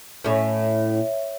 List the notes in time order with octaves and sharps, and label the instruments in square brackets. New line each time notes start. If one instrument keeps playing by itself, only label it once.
[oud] A2 C#4 [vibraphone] C#5 E5